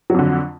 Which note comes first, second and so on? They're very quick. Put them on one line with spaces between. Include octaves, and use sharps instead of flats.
F#3 F2 D3